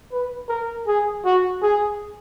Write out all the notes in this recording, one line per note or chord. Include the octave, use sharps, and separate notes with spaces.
B4
A#4
G#4
F#4
G#4